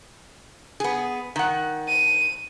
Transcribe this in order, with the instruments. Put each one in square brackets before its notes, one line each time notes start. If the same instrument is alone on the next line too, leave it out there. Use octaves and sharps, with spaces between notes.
[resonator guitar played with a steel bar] B3 G#4
D#3 F#5
[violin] D#7